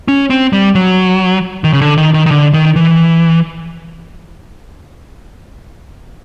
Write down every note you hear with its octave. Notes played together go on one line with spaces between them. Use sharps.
C#4
C4
G3
F#3
D#3
C#3
D3
D#3
D#3
D#3
D3
D#3
E3